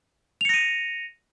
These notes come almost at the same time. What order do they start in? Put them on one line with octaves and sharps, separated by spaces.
F7 C#7 A#6 D#7